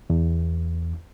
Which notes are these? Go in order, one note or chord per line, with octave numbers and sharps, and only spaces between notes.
E2